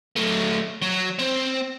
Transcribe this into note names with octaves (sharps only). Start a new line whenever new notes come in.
F#3 A3
F#3
C4